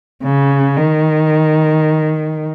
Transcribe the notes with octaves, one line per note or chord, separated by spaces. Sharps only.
C#3
D#3